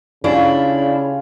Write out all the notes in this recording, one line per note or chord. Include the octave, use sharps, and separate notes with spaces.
C#3 C#4 D4 E4 F4 G4